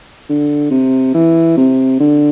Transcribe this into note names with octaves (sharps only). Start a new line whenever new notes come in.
D3
C3
E3
C3
D3